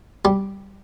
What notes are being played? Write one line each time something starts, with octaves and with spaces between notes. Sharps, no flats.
G3